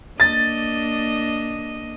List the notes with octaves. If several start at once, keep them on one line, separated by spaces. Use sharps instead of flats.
A#3 D4 D#5 A6